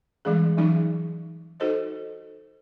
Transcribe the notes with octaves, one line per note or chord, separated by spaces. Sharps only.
E3 G3 G#3 C#4 G#4
E3 F#3 C#4 D#4 G#4
D#4 F#4 A4 C5 D#5